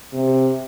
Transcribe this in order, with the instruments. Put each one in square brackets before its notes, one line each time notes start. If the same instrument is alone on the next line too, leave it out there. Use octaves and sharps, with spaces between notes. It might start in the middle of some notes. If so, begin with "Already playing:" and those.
[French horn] C3